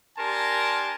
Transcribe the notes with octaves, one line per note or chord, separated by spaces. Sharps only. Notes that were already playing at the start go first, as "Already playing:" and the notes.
D4 G4 A#4 G#5 A5 C6